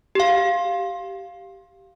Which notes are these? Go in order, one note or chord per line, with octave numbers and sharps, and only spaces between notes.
G4 F5